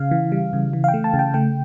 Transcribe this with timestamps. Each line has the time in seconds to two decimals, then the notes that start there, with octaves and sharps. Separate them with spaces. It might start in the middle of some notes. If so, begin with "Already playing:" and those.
Already playing: C#3 F5
0.11 E3
0.32 G3
0.53 C#3
0.73 E3
0.84 F5
0.88 G5
0.94 A3
1.04 A5
1.14 C#3
1.19 G5
1.34 A3 G5